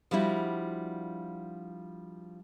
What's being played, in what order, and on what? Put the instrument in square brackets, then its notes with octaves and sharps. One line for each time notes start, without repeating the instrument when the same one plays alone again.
[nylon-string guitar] F3 G3 D4 E4 F#4